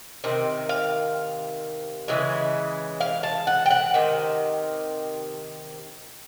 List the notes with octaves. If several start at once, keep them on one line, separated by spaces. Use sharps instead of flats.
C3 D#3
F5
C#3 E3 G#3
F5
A5
F#5
G5
F#5
C3 D#3